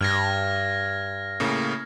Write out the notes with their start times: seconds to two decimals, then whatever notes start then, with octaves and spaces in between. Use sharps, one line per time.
0.01 G2 F6 G#6 A#6
1.40 A2 C#3 A#3